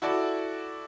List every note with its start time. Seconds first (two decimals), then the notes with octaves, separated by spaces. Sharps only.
0.02 E4 F#4 A4 D5